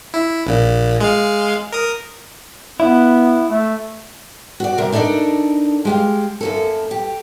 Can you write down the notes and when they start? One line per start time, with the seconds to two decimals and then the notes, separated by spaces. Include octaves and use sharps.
0.14 E4
0.47 A#1 A#2
1.01 G#3 F5
1.72 A#4 D#6
2.80 B3 E4
3.49 A3
4.60 F#4 D5
4.78 C3 G3 A#4
4.92 D4 D#4 A4 A#4 D5
5.85 G#3 G4 F5
6.41 F#2 A#3 A4
6.91 G4